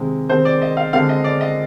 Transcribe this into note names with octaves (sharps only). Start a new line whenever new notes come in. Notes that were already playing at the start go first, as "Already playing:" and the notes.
Already playing: C3 D#3 G#3 C4
D#3 G#3 C4 C5
D5
D#5
F5
D3 G#3 C4 F5
D#5
D5
D#5